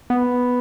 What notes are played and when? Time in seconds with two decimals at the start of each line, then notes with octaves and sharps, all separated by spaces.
0.10 B3